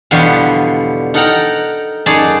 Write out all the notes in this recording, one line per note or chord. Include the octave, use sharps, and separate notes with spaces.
E2 B2 D3 F3 G3
D#4 A4 A#4 F#5 G5 A#5
F#2 D#4 G#4 D5 A5